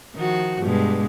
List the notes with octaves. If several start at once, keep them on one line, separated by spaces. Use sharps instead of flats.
D#3 F3 F#4
G2 B2 G#3